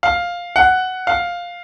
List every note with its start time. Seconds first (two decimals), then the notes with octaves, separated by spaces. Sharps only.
0.03 F5
0.56 F#5
1.07 F5